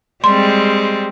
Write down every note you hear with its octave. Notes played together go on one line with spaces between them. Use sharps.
G3 G#3 C4 C6